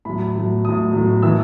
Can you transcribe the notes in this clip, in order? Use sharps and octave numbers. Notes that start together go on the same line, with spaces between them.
A2 F#3 B5
A2 F#3
A2 F#3 D#6
A2 F#3
A2 E3 E6